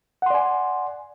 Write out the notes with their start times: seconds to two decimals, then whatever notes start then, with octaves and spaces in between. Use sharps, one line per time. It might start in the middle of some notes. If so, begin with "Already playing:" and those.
0.22 F#5
0.26 C6
0.30 D5
0.34 G#5